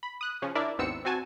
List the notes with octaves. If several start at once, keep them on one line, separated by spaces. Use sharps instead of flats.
B5
D#6 F#6
C#3 F3 C#4
D4 E4 A#4 D5 E5
G#1 D#2 B3 C4 E6 C#7
C4 F#4 G#5 A5